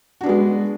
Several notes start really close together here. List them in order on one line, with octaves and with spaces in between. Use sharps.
F#4 D4 B3 G#3